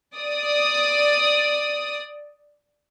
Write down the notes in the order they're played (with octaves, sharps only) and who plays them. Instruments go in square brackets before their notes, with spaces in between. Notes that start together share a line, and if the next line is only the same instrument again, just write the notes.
[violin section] D5 D#6